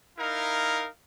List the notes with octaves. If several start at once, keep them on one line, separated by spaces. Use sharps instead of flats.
D#4 E4 A#4 F5